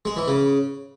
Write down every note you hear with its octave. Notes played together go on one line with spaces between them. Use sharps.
G#3
E3
C#3